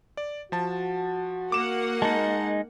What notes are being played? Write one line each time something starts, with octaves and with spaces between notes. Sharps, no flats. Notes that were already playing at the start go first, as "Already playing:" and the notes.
D5
F3 F#4 A5
A#3 F#5 D6 E7
G#3 D#4 A5